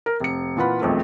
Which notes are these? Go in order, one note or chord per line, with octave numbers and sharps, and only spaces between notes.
A#4
F1 C#7
A#2 E3 F4 F#5 B5
E1 B1 F2 A3